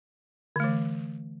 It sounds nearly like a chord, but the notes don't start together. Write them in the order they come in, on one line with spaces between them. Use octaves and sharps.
D3 A3 E3